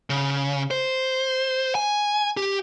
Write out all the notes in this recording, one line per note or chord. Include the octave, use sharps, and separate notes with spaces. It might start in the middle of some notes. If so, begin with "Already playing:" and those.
C#3
C5
G#5
G4